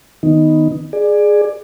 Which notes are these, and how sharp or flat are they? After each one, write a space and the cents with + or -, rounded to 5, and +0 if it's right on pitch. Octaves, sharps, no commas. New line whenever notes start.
D#3 +0 B3 +0 D#4 +0
G#4 +0 D5 +20